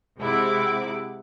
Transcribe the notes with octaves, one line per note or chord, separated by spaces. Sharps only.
C3 G#3 E4 G4 F#5 D6